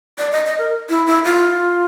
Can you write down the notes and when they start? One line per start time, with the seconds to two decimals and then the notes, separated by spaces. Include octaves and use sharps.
0.18 D5
0.32 D#5
0.45 D#5
0.58 A#4
0.89 E4
1.07 E4
1.25 F4